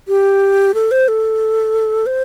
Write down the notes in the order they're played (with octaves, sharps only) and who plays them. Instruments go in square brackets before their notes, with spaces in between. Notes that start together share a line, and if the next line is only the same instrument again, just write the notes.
[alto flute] G4
A4
C5
A4
C5